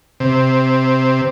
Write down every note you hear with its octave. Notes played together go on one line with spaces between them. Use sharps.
C3